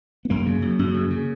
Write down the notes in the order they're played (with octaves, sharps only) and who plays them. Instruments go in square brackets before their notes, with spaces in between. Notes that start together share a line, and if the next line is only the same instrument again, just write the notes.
[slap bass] B3
F#2 A#3
C#3
F#2
F#2
C#3
C#3